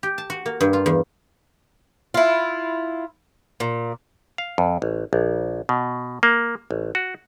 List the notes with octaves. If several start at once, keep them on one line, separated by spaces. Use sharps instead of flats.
G4
A5
F#4
A#3
G2
F4
E2
E4 F4
A#2
F5
F2
A1
A#1
B2
A#3
A1
F#4